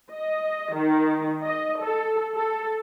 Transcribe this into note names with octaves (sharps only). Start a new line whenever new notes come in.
D#5
D#3
D#5
A4
A4